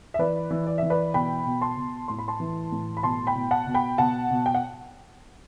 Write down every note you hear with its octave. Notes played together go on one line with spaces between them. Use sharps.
E5
E3 B4 D5
E3
D5
E3 E5
B4 D5
B2 G5 B5
B2
A5 C6
B2
A2 C6
B5
A5 C6
E3
A2
B5
B2 A5 C6
G5 B5
B2
F#5 A5
B2
G5 B5
B2 F#5 A5
B2
G5
F#5